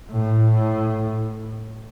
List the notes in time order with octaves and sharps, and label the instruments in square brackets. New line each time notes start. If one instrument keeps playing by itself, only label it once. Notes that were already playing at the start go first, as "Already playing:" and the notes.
[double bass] A2